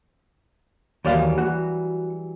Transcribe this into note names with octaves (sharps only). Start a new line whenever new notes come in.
D#2 E3 F#3 G3 D5 F5
F#4